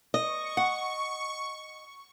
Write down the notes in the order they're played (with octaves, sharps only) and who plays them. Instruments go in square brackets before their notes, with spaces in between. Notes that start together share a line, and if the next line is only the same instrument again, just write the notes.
[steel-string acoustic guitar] D#5 [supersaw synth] C#6
[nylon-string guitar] F#5